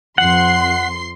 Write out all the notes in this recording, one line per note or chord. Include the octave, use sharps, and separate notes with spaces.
F2 F#5 C6 C7